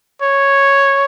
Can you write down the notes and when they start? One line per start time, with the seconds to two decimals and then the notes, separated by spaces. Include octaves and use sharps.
0.22 C#5